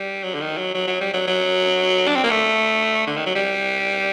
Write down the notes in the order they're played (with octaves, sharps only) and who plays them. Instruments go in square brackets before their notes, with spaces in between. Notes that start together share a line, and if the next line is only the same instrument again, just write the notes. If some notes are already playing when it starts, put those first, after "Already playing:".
Already playing: [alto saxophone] G3
F#3
D3
D#3
F#3
F#3
F#3
G3
F#3
F#3
D4
C4
A#3
A3
D3
D#3
F#3
G3